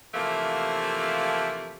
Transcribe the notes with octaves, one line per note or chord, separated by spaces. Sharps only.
C3 E3 F3 A3 A#3